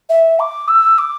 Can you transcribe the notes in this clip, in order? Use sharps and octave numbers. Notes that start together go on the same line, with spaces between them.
E5
D6
E6
D6